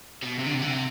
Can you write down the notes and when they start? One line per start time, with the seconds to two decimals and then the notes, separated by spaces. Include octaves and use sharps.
0.23 B2
0.39 C3
0.46 D3
0.54 C3
0.62 D3
0.70 C3